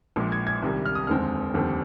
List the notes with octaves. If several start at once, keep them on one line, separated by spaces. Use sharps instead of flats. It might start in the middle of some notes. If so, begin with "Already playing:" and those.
A#1 A#2 G#3
G#6
G#6
C2 C3 D#3 G3
F6
D#6
F1 D#2 D3 G#3 C4 F6
F1 D#2 D3 G3 C4